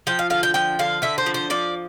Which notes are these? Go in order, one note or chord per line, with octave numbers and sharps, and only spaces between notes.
F3 G5
F5
D3 F5
G5
F3 G5
D3 F5
D3 E5
C5
F3
C5
F3 D5